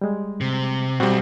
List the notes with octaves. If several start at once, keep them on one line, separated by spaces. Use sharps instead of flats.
G3 G#3
C3
B1 G3 C4 F#4